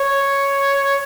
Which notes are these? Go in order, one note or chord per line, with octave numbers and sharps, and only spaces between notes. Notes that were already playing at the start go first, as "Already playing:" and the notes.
Already playing: C#5